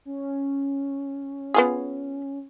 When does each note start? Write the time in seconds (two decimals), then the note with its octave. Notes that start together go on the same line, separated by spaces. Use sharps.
0.05 C#4
1.54 B3 F4 G#4